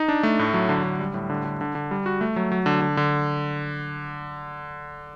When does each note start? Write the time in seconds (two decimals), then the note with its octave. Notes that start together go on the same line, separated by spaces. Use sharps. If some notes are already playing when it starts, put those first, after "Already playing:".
Already playing: D#4
0.08 D4
0.23 A3
0.39 A2
0.54 F#3
0.69 D3
0.84 D3
1.00 G3
1.14 A2
1.30 D3
1.45 D3
1.61 D3
1.75 D3
1.91 G3
2.06 F#4
2.21 A3
2.36 F#3
2.52 F#3
2.66 D3
2.81 D3
2.97 D3